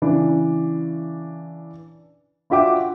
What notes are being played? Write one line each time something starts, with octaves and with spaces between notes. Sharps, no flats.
C#3 E3 D4
D4 F4 F#4 E5 G5 D6